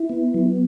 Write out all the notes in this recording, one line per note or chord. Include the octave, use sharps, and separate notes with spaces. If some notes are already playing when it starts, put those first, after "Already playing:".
Already playing: E4
B3
F#3